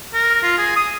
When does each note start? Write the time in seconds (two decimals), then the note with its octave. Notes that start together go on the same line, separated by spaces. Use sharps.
0.14 A#4
0.43 F4
0.58 G#4
0.76 D#6